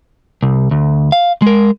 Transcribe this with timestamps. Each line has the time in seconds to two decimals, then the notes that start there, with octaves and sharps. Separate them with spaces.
0.43 C2
0.71 D2
1.12 F5
1.42 G#3 A#4